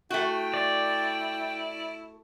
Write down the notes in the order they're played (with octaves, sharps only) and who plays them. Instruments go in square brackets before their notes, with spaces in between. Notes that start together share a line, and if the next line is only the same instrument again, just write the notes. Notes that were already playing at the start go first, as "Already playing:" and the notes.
[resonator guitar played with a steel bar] A3 F#4 [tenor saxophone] E4 [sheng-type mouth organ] G5
[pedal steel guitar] D5